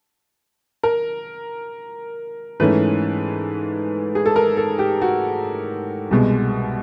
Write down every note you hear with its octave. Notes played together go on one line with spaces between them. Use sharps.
A#4
G#2 E3 A3 C#4 B4
G#4
A4
A#4
A4
G4
F#4
C2 B2 G#3